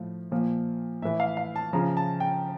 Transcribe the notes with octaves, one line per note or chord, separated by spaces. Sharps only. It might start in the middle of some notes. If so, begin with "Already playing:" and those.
Already playing: A2 F3
A#2 F3
A2 E3 E5
F5
F5
A5
C#3 F3 A#5
A5
G5